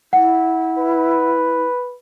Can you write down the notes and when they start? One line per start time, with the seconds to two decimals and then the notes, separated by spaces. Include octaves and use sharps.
0.13 E4 F#5
0.79 B4